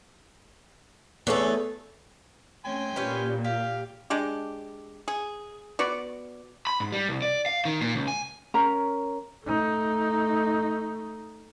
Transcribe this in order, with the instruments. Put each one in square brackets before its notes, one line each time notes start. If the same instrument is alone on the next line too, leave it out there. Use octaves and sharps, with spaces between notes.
[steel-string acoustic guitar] E2 C#4 A4 [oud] A3 B3
[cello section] A3 C#4 [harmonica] G5 G#5 C6
[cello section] A#2 [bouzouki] C#4 G4 B4
[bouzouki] G4 [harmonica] F5
[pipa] G#3 D4 G4
G#4
B3 F#4 D5
[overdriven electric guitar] B5
G#2
G3
C2
D5
F5
D#3
A#2
C#2
G#5
[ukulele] C#4 A#4 A#5
[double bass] A3 D#4